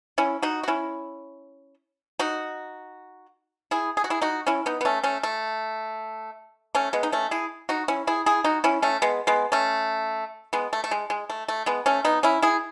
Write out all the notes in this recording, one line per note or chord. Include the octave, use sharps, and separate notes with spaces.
C#4 E4
D#4 F#4
F#4
C#4 E4
D#4 F#4
E4 G#4
G#4
F#4
E4 G#4
D#4 F#4
C#4 E4
B3 D#4
B3
A3 C#4
A3 C#4
A3
A3 C#4
G#3 B3
D#4
A3 C#4
E4 G#4
D#4 F#4
C#4 E4
E4 G#4
E4 G#4
D#4 F#4
C#4 E4
A3 C#4
G#3 B3
G#3 B3
A3 C#4
G#3 B3
A3
A3
G#3
G#3
A3
A3
G#3 B3
A3 C#4
B3 D#4
C#4 E4
E4 G#4